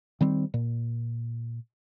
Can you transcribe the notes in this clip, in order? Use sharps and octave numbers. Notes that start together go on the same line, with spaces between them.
D#3 G3 C4
A#2